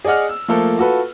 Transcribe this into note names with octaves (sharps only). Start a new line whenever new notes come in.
G#4 D5 D#5 F#5 F6
E6
F3 A3 A#3 A4
F4 F#4 A4 B4